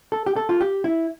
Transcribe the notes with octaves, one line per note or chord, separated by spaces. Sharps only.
A4
G4
A4
F4
G4
E4